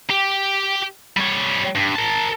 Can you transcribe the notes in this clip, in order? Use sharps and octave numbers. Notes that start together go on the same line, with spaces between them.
G4
G3 C#5
G2
A#4 A5